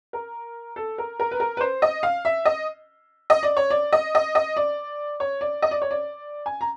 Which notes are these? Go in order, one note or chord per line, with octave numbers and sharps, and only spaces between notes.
A#4
A4
A#4
A#4
B4
A#4
B4
C5
D#5
F5
E5
D#5
D#5
D5
C#5
D5
D#5
D#5
D#5
D5
C#5
D5
D#5
D5
C#5
D5
G#5
A#5